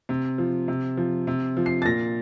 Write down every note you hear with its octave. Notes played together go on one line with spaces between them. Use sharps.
C3
F3
C3
F3
C3
F3
C7
A6
A#2 A#6